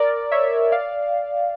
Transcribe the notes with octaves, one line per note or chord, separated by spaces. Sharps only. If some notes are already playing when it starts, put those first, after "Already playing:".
Already playing: A#4 D5
C#5 E5
D5 F5